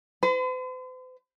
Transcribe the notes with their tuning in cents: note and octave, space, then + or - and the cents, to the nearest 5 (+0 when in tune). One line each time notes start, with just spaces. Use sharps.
C5 -45 B5 +45